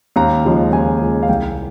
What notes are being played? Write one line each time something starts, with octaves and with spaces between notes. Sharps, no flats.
D#2 A#5
C#3 F3 G#3
D#2 G#5
C#3 F3 G#3
F5
C2 G5